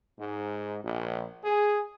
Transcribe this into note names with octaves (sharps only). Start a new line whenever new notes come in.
G#2
A#1
G#4